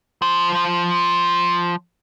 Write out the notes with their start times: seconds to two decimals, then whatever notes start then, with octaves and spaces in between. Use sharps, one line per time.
0.22 F3 C5